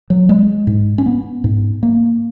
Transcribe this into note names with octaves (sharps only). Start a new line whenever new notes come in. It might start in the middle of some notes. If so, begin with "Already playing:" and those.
F#3
G#3
G#2
C#4
B3
G#2
A#3